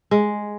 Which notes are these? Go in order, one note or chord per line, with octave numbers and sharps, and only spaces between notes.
G#3